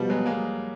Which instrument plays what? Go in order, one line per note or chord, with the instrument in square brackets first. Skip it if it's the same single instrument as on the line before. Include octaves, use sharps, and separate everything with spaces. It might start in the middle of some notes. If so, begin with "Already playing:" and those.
Already playing: [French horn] B2 [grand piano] F3 G3
[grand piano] F#3 G#3
G#3 A#3